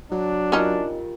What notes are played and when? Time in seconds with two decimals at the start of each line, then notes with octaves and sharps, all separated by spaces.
0.12 F#3 D4
0.52 C#4 D#4 F4 G4 A#4